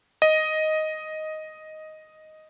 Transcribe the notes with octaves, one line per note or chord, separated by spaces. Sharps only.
D#5